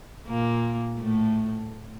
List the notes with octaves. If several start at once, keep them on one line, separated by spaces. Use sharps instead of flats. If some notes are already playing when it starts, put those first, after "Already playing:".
A#2 A#3
A2 A3